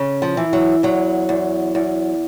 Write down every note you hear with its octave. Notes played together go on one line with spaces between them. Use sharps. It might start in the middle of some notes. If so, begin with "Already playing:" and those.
Already playing: C#3
F3
E3
F#3
E2 F#3
E2
E2